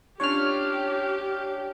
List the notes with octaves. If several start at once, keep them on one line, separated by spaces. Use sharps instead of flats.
C#4 D4 F4 G4 C#5 F6